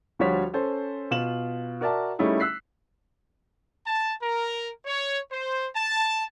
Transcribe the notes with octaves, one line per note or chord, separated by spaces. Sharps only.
D2 F3 G3 F#4 C#5 B6
C#4 A4 C5
B2 F4 E7 F#7
F#4 A#4 D5 E5 A5
G3 A3 C#4 D#4 E4 G#4
E6 F#6 B6 C7
A5
A#4
C#5
C5
A5